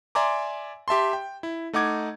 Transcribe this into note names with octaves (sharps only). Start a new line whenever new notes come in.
D5 E5 G#5 A#5 C6 D6
G4 E5 A5 C6
G5
E4
A3 D#4 F#5 D6 G#6